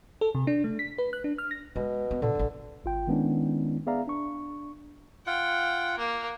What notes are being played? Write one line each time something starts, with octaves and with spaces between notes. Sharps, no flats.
A4
C3
D4
A3
B6
B4
F#6
D4
F6
A#6
B2 G#3
B3
A#2 D3
A1 G#2
G#1 F4 G5
D#3 G#3 B3 C#4 D4 E4
B3 G#4 D5 E5 F5 A#5
D4 C#6
F4 F#5 G5
A#3